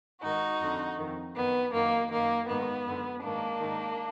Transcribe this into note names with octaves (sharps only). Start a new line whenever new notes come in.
G#2 D#3 D#4 F#4
F2 D3
F2 D#3
F#2 D#3 B3
F#2 D#3 A#3
F#2 D#3 A#3
G#2 D#3 B3
F#2 D3
G#2 D#3 A#3 D4
G#2 D#3